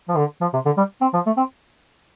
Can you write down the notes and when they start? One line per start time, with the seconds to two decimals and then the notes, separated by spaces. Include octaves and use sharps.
0.09 F3
0.17 D3
0.41 F3
0.53 C3
0.66 D3
0.77 G3
1.01 C4
1.14 F3
1.26 A3
1.37 C4